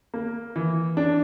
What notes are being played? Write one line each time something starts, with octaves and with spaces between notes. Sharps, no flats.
A#3
E3
D4